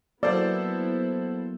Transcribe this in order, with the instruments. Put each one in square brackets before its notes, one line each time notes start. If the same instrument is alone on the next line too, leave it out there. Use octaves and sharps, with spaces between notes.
[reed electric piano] F#3 A#3 [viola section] B3 E4 [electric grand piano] A4 C5 [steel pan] D5